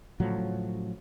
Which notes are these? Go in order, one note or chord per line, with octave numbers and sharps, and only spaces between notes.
A2 C#3 F3 F#3